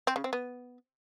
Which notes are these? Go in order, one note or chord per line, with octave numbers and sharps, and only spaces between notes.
C4
C#3
C4
B3